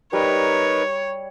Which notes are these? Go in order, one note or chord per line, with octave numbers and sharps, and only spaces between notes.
G3 D#4 A#4 B4 C#5